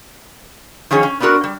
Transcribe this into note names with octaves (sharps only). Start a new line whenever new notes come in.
D#3 F3 C#4 G#4 C#5
C#4
B3 C4 D4 F#4 A#4
G3